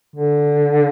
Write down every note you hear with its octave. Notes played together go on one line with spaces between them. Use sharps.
D3